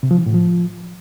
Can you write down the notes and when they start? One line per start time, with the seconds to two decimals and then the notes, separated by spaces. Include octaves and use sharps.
0.03 C3
0.11 F3
0.19 E3
0.26 A2
0.34 F3